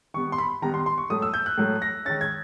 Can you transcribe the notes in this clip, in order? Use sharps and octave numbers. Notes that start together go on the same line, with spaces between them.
D#3 G3 B3 C#6
C6
B5
D#3 G3 B3 A#5
C6
C6
C#6
A2 F#3 A3 D#6
E6
G6
F#6
A2 F#3 A3
A#6
D#3 G#3 C#4 A6
G#6